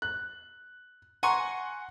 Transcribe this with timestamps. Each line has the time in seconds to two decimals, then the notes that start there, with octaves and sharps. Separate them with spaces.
0.02 F#6
1.23 F#5 G#5 A#5 C6 C#6